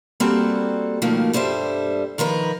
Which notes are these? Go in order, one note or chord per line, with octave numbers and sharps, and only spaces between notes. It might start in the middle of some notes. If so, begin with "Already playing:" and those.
G3 A#3 C4 F#4 A4
B2 D#3 F3 F#3 A3 A#3
G2 G3 A4 C5 E5
D#3 F3 A#4 B4